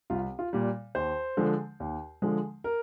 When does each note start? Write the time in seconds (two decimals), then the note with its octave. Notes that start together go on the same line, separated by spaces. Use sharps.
0.10 C2 F4
0.39 F4
0.53 A#2 G3
0.95 D#2 C5
1.37 D3 F3 G#3
1.80 D#2
2.22 D3 F3 G#3
2.64 A#4